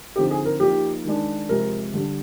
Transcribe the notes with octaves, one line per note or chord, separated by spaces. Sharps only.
D3 F3 C4 D#4 G4
G#4
A#4
A#2 F3 A#3 D#4 G4
D#3 G#3 D4
C3 F3 G#3 A#4
D3 G3 D4